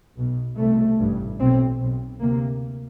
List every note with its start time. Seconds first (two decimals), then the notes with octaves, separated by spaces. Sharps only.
0.17 B1 B2
0.58 C2 B2 A3
0.99 A1 G2
1.39 B1 B2 C4
1.79 B1 B2
2.21 D2 C3 A#3